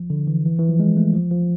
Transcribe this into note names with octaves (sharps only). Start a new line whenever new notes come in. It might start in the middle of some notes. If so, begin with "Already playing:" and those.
Already playing: F3
D3
E3
E3
E3
F3
G#3
A3
F3
F3